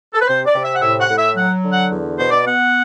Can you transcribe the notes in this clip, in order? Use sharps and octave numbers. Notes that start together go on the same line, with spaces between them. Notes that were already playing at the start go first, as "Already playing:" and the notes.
A4
B4
C3 C5
D5
C3
E5
F#5
A2 E5
F#5
A2
E5
F#3 F#5
D3
F#5
E2
B2 C5
D5
B3 F#5